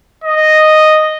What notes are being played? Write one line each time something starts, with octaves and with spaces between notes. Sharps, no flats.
D#5